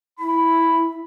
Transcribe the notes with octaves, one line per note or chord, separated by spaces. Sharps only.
E4 B5